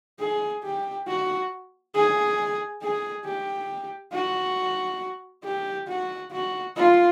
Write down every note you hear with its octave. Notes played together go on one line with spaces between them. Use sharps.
G#4
G4
F#4
G#4
G#4
G4
F#4
G4
F#4
F#4
F4